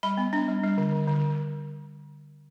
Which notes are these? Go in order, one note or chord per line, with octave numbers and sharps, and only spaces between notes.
G3 B5
B3
D4
G3
G3
D3
D3
D3